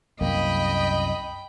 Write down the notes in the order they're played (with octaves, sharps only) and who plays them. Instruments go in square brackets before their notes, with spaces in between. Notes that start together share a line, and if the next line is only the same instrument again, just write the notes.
[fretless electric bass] C2 F#2 A#3 [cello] D#5 [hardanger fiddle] G5 B5